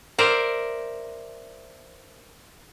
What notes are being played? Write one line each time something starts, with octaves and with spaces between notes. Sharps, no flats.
A#4 C5 D5 E5